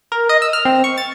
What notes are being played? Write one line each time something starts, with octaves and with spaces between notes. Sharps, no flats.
A#4
D#5
E6
F6
C4
C#6
A6